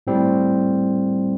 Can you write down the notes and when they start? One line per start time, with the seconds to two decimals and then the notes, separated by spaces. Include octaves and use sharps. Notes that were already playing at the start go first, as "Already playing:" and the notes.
0.07 A2 G3 C4